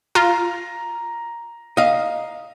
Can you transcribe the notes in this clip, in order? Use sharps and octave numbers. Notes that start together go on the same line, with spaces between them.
F4 A#5
D#5 F5